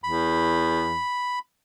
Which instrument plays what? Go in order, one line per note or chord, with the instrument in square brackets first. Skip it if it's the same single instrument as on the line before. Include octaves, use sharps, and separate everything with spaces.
[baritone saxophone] E2 [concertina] B5